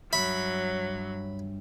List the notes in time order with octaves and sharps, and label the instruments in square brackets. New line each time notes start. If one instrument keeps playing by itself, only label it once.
[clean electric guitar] G2 C#5 E5 [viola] F#3 [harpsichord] B5